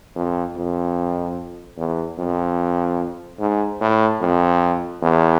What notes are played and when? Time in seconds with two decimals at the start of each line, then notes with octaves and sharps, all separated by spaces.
0.15 F2
0.56 F2
1.78 E2
2.18 F2
3.39 G#2
3.81 A2
4.21 F2
5.02 E2